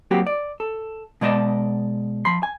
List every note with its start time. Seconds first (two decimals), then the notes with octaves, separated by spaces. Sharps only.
0.11 F#3 A#3 C4 F#4 G4
0.27 D5
0.60 A4
1.21 B2 G#3 D5 D#5 A5
2.25 F3 B5 C6
2.43 G#5